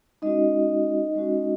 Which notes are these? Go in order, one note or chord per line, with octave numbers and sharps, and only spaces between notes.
G#3 C#4 D#4 F#4 D#5
G#3 C#4 F#4